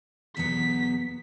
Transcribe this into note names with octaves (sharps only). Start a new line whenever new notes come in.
E2 B2 F#3 B3 B6